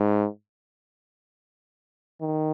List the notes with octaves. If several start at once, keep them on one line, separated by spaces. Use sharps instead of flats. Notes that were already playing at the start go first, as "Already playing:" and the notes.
Already playing: G#2
D#3